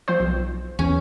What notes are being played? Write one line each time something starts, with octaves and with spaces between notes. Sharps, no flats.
F3 C4 C5
B1
E2 C#4